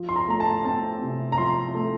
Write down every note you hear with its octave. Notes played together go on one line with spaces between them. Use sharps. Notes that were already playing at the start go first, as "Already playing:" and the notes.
Already playing: F3
C6
A#5
A3 A#5
A5
C4 A5
C3
A#5
F3 C6
A3